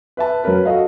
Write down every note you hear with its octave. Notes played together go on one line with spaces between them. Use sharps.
B4 E5 A5
F#3 C#4 A#4 B4
F#4 A4 D#5 F5